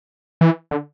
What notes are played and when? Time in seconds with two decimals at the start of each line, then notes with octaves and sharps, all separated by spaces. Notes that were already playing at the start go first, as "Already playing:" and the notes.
0.41 E3
0.71 D3